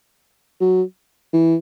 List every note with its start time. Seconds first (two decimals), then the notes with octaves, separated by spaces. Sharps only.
0.61 F#3
1.34 E3